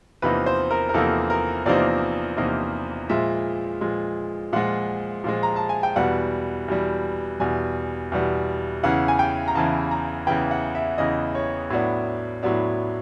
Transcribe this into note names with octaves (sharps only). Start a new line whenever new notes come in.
E2 C3 F3 A#3 D#4 B4
C5
A#4
A#4
E2 C3 F3 A#3 D#4 A4
A#4
E2 C3 F3 A#3 D#4 D5
E2 C3 F3 A#3 D#4
A#2 F3 G#3 E5
A#2 F3 G#3
A#2 F3 G#3 F#5
A#2 F3 G#3
A#5
A5
G#5
G5
E2 B2 G3 F#5
E2 B2 G3
E2 B2 G3 G#5
E2 B2 G3
E2 C#3 E3 F#5
G#5
G5
A#5
E2 C#3 E3 A5
A#5
E2 C#3 E3 G5
F#5
E5
E2 C#3 E3 D#5
C#5
A2 F#3 B3 D4
A2 F#3 B3 D4